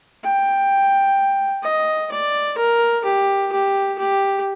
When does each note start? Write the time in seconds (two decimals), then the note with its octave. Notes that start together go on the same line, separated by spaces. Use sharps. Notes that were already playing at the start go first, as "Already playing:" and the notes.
0.24 G5
1.63 D#5
2.11 D5
2.58 A#4
3.05 G4
3.52 G4
3.98 G4